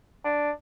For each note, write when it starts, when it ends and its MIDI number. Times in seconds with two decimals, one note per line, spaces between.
0.24 0.51 62